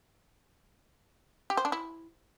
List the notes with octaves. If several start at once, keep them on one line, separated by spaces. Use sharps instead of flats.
G4
C5
D4
E4